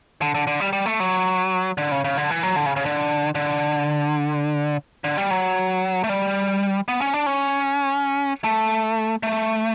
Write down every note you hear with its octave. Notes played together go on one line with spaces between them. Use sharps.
D3
D3
D3
G3
G3
A3
F#3
D3
C#3
C#3
D3
E3
F#3
D3
C#3
C#3
D3
D3
D3
G3
F#3
A3
G3
B3
C#4
D4
C#4
A3
A3